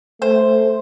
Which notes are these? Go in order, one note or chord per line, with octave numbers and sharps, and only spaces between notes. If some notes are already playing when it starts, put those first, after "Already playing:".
A3 C5